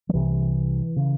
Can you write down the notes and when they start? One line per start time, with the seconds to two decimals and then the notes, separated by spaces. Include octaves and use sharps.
0.09 F3
0.14 C2 C3 E3
0.96 C#3